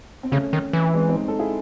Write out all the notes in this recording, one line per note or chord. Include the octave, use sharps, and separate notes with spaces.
C4
C#3 A3 C#4
D#3
E3
G#3 C4
C4 D#4
A4
E4 G#4